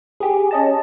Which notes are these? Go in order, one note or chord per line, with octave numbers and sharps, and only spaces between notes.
G4 G#4
C#4 D#5 A5